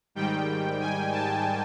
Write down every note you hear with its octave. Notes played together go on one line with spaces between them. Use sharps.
G#2 D#3 G3 G5
G#5
A5